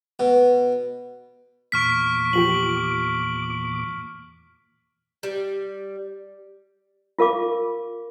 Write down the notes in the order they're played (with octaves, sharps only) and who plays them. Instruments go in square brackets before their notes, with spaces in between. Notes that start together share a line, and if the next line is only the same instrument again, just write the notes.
[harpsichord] B2
[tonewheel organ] E2 A#2 D6 [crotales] C#6 F6 B6
[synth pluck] F3 F4 G4 [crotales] F#7
[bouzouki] G3
[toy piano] F4 A#4 F5 D6